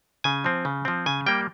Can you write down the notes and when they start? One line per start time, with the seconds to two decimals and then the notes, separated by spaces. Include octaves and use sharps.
0.24 C#3 G#5
0.44 F3 C4
0.65 C#3
0.85 F3 C4
1.06 C#3 G#5
1.26 G3 A#3 G5